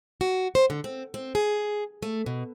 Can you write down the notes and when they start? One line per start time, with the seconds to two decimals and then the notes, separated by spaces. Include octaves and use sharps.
0.21 F#4
0.55 C5
0.70 D3
0.84 C4
1.14 C4
1.35 G#4
2.03 A3
2.26 B2